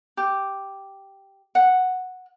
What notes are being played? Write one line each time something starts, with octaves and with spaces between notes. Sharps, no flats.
G4
F#5